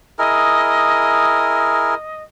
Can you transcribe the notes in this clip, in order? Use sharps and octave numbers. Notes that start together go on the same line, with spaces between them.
E4 G#4 A#4 D#5